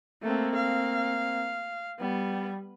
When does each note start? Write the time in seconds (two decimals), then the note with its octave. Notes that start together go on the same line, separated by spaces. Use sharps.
0.22 A3 A#3 C4
0.55 F5
2.00 G3 B3